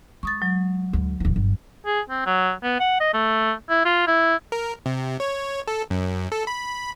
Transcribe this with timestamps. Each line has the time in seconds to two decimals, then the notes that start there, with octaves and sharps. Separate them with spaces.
0.23 G#3 C#6 D#6 A6
0.42 F#3
0.93 D2 G#3
1.20 D1 E3
1.36 G1
1.86 G#4
2.09 C4
2.26 F#3
2.63 B3
2.80 F#5
3.00 D#5
3.14 A3
3.69 E4
3.85 F4
4.07 E4
4.52 A#4
4.86 C3
5.20 C#5
5.68 A4
5.90 F#2
6.32 A4
6.47 B5